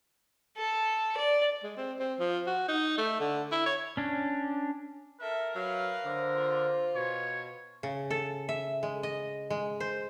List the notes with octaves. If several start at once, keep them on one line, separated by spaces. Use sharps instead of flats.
A4
D5
G#3
C4
C4
F3
F#4
D#4
A3
D3
E4
C#5
C#4 D4
A4 A#4 E5
F#3 B4 F5
D3 C5
F4
B2 C#5
C#3
A4
E5
G#3
D#5
G#3
C5